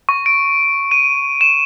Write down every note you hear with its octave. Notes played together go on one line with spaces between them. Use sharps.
C#6
D7
D#7
E7